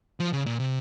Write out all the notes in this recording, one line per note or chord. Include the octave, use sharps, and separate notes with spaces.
F3
C#3
A#2
C3